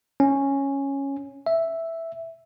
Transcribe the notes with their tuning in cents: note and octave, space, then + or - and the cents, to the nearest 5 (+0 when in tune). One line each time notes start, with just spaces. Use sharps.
C#4 -5
E5 +0